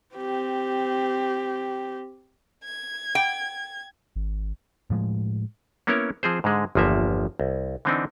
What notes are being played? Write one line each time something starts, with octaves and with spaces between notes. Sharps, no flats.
C4 G4
G#6
G5
G#1
A2 F3 G#3
A#3 B3 C#4 E4 A#4 C#5
F3 C4 G#4 C5
G#2 D3 G#3
G1 E2 F3 A#3 E5
C2
D3 E3 C4 D4 D#4